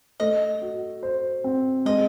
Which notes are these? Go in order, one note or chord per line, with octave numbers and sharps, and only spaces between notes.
A3 D#5
F#4
C5
C4
G#3 D#5